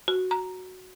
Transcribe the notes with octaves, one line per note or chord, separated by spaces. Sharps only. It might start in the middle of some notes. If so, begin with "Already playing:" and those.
F#4
A#5